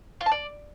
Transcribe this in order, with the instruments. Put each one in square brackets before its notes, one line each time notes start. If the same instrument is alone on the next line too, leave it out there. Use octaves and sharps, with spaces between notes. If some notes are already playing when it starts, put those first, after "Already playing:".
[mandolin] F4
A5
D5